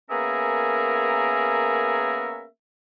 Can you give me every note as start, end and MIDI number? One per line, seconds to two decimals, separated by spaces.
0.10 2.44 58
0.10 2.44 59
0.10 2.44 61
0.10 2.44 68
0.10 2.44 70
0.10 2.44 76